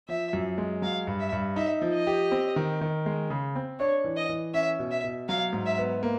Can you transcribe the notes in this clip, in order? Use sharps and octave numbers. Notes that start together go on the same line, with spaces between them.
F3 E5
F#2
G#3
F#3 F5
G2
E5
G2
D#4 E5
F3
D#5
G4
C4
D#3
D#3
G#3
C#3
C4
D4 C#5
E3
D#5
E3
C#4 E5
B2
E5
B2
F#3 F5
G#2
E5
B3
A#3